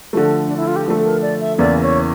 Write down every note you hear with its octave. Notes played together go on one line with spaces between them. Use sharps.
D3 F3 A3
D4
E4
F4
G4
D3 F3 A3 A4
A#4
D5
E5
E2 C#3 E3 A#3 D5
C#5